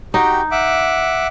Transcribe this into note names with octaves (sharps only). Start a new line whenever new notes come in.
D#4 F#4 G4 G5
E5 F#5 D6